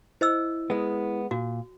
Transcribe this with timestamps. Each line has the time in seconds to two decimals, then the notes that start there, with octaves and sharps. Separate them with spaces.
0.21 E4 C5 D#5 E6
0.70 G#3 B3
1.31 A#2 F#4